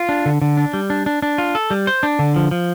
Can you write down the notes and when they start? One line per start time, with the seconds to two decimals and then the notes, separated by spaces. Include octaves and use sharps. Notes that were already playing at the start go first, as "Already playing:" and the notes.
Already playing: F4
0.09 D4
0.26 D3
0.42 D3
0.57 D4
0.74 G3
0.90 D4
1.06 D4
1.22 D4
1.38 F4
1.55 A4
1.71 G3
1.87 C5
2.03 D4
2.19 D3
2.36 F3
2.51 F3